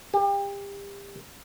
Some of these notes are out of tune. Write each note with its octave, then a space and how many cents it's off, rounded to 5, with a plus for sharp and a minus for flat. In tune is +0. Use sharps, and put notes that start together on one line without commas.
G4 +35